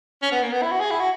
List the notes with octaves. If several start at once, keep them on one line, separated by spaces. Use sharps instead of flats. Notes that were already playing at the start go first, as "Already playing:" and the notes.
C#4
B3
A#3
B3
E4
F#4
G#4
E4
F#4